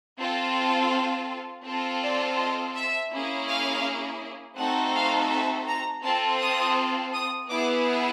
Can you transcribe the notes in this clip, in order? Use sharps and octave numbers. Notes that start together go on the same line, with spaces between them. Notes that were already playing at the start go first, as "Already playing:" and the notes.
C4 F4 A4
C4 F4 A4
D5
D#5
E5
A#3 C#4 E4 G#4
F5
A3 C4 D#4 F#4 A4 F#5
F5
E5
A#5
C4 F4 A4 A5
D#6
D#6
B3 E4 G#4 D6